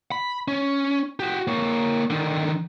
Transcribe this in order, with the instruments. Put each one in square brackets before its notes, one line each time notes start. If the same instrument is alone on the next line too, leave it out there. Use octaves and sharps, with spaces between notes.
[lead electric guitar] B5
C#4
F#4 G4
A#3 C#5
D3 D#3